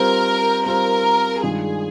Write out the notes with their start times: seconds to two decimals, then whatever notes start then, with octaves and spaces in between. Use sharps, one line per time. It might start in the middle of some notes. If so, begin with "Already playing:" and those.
Already playing: G3 C4 F4 A#4 C5
0.66 G3 C4 F4 A#4 C5
1.42 G2 D#3 G#3 D4 F4 G#4